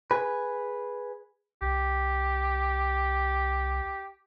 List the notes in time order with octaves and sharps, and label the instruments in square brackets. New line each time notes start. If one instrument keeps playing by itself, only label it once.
[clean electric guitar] G#4 B4
[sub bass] C2 [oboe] G4